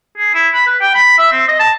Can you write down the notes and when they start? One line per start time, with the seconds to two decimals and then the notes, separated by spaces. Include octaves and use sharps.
0.18 G#4
0.34 E4
0.54 B5
0.67 B4
0.81 G5
0.95 B5
1.18 E5
1.32 C4
1.48 D#5
1.60 A5